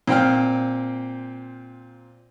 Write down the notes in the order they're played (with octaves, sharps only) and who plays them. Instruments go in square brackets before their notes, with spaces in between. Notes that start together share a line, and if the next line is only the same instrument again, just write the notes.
[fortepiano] A#2 C4 G5 F6